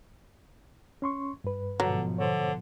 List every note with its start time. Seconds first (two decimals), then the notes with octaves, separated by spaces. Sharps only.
1.02 C#4 C6 C#6
1.44 G2 B4
1.80 G#2 B2 D3 F3 F#3
2.18 D3 C5 C#5